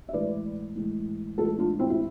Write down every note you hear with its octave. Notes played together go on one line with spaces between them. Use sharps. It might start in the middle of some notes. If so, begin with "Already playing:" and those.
E5
A2 E3 G#3 B4 D5
A2 E3 G#3
A2 E3 G#3 F4 A4
D4 F4
C4 E4
E4